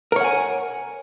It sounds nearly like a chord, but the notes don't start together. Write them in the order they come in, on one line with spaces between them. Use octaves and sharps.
A#4 C#5 F#5 G#5